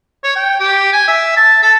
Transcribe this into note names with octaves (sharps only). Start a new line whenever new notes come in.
C#5
G5
G4
G#5
E5
A5
A4